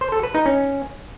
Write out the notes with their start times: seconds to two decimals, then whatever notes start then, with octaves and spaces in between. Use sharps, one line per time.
0.01 C5
0.12 A4
0.23 B4
0.34 D#4
0.46 C#4